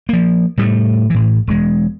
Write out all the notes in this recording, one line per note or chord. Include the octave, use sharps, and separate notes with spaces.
F3 A#3
A2 G3 A3
A2 E3
E1 G#3